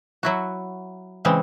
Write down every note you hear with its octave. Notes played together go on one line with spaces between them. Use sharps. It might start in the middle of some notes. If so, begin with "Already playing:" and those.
F#3 E4 F#4
C#3 E3 G#3 C4